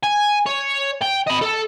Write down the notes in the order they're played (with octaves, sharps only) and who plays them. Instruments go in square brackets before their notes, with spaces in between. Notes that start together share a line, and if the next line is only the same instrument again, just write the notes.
[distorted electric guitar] G#5
C#5
G5
D#5 B5
A4